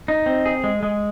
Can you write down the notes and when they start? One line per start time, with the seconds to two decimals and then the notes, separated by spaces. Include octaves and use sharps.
0.08 D#4
0.26 C4
0.46 G#4
0.64 G#3
0.83 G#3